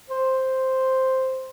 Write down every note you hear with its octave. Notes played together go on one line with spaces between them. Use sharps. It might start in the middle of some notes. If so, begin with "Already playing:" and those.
C5